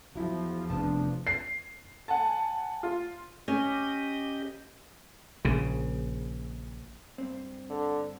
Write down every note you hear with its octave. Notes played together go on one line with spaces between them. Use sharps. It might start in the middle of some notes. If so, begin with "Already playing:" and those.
E2 F3 F#3 E4
F1 B3 D4 A5
C7
F#5 G#5 A5
F4
C#4 G4 D#5
A#1 C#3
G2 C4
D3